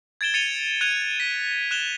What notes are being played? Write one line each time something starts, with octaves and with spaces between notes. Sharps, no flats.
G#6 A6 D7 E7 G7
A6 C#7 D#7 F7 G7
F#6 G#6 D#7 F7
B6
F#6 E7 F7 G7